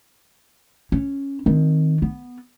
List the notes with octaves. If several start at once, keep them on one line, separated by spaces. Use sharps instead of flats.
C#4
D#3 C4
B3